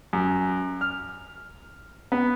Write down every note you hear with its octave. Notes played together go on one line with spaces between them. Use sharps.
F#2
F6
B3